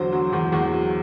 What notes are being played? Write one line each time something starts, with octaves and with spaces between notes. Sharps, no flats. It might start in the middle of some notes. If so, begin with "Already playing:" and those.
Already playing: E2 D3 F#3 C5
F#3
E2
E2
F#3